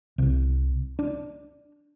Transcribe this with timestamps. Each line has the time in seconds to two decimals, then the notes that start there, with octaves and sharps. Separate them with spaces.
0.18 C2
0.99 D4